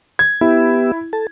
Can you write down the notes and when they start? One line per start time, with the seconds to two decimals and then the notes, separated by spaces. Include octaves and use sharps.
0.19 G#6
0.41 B3 E4 G4 E5
1.13 A4 A5